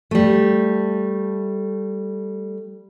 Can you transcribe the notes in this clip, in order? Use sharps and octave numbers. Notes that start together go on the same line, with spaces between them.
G3 A3